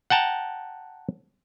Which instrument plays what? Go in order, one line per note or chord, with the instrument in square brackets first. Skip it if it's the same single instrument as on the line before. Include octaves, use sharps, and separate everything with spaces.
[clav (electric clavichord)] F#5 G5 A5 A#5